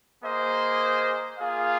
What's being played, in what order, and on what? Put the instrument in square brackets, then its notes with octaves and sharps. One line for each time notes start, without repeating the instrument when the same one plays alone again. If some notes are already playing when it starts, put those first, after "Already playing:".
[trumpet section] A#3 G#4 C5 D#5
A#3 F4 G#4 F5